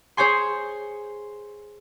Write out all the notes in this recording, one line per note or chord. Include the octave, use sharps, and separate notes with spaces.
G#4 C5 C#5 G#5 C6